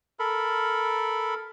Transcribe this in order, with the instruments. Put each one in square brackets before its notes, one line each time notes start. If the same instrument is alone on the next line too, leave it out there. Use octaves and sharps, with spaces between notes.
[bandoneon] A4 A#4 B5